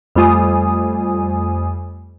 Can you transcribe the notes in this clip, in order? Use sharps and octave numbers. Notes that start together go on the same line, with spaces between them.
F2 G3 A3 F4 G#5 D#6